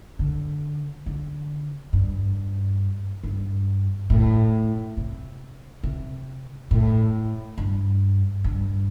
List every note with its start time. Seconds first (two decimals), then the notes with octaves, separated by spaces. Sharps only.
0.19 D3
1.06 D3
1.93 G2
3.23 G2
4.10 A2
4.97 C3
5.83 C3
6.71 A2
7.58 G2
8.44 G2